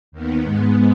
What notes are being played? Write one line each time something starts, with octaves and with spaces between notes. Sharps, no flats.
D#2 D#3 B3
G#2 G#3 B3